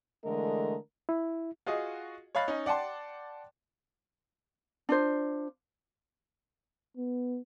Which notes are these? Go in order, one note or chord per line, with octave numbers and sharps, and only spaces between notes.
D3 E3 G#3 A3 A#4 D#5
E4
F4 F#4 G#4 D#5
C#5 D#5 F5 B5 F#6 A6
C#4 D#4
D5 F#5 G5 A5 C6
D4 F4 C5
B3